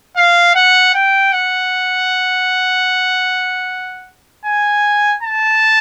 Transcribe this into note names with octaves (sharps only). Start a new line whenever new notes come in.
F5
F#5
G5
F#5
G#5
A5